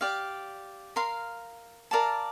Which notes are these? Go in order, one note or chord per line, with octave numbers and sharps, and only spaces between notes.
G4 D5 F5
A#4 F5 C6
A#4 D5 F5 A5